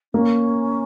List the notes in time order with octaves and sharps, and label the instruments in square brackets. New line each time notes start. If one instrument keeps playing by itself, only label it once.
[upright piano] A#3 [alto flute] C#4